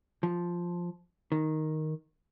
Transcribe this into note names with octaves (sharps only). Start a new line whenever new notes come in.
F3
D#3